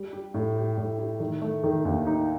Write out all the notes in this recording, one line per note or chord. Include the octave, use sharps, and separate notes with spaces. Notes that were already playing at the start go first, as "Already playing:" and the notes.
Already playing: G3
G4
A2
G4
A2
G4
D#3
A3
D#3
D#2
D#4